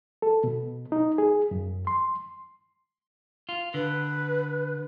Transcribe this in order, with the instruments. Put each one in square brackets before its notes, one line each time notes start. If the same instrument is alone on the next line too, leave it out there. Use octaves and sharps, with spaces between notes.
[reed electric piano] A4
B2
D#4
G#4
F#2
C6
[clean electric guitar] F4
[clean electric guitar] D3 [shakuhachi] B4